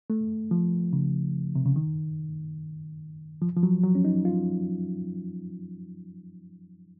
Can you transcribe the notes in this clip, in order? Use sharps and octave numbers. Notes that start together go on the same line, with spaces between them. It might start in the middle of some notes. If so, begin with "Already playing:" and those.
A3
F3
C#3
C3
C#3
D#3
F3
F3
F#3
F#3
C#4
D#4
F4